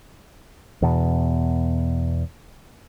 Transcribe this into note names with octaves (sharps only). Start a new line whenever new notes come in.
E2 B2